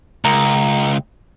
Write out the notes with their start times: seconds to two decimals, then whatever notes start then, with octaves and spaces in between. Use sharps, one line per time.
0.25 C#2 A#4